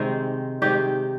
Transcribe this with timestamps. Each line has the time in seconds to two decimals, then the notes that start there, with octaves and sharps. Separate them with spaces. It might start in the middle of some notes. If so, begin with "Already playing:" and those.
Already playing: C3 D#3 G#3 C4 D#4
0.62 C3 D#3 G#3 D#4 G4